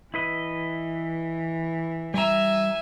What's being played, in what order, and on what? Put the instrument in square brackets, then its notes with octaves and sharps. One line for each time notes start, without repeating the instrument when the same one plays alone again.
[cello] E3 [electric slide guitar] E4 B4 D#5
[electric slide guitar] G3 A#5 [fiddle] E5 G#5